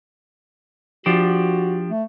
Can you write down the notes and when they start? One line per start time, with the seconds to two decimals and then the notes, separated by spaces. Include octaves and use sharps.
1.06 F3 D4 F#4 G4
1.89 A3